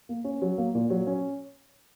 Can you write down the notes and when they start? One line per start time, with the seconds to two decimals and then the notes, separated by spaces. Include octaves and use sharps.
0.09 A#3
0.24 C#4
0.42 F#3
0.58 A#3
0.74 A#2
0.90 F#3
1.07 C#4